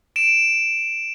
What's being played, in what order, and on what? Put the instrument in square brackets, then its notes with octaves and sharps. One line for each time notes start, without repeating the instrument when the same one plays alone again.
[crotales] D7 E7